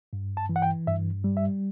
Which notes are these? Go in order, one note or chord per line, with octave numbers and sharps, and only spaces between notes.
G2
A5
E3
F#5
G5
G2 E5
G3
E5